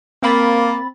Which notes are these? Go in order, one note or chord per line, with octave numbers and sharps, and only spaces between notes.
A#3 C4 B5 A6